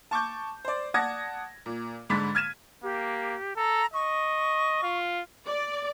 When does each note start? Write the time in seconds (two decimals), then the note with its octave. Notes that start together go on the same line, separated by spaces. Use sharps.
0.11 A5 C#6 D6 G6
0.65 C5 D5
0.94 D5 F#5 A5 D#6 G#6 A#6
1.66 A#2
2.10 G#2 D3 G#3 B5 A6 B6
2.35 F6 G#6 D#7 E7
2.83 A#3 G4
3.56 A4 A#5
3.94 D#5 C#6
4.83 F4
5.46 D5